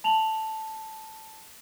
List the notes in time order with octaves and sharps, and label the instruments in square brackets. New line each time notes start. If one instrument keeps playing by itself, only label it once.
[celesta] A5 F7 F#7